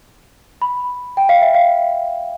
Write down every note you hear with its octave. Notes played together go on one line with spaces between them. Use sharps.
B5
G5
F5
E5
F5